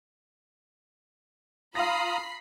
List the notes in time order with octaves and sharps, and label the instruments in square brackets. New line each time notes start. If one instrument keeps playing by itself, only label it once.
[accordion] F4 A#5 D#6 [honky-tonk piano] F5 A#6 [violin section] B5 C7